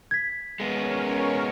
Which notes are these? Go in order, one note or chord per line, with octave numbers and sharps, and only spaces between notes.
G#6 B6
G#3 B3 C#4 A#4 C#5